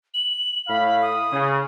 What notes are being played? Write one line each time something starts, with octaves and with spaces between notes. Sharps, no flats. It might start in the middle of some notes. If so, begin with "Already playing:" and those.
F#7
A2 F5 B5
D#6
C#3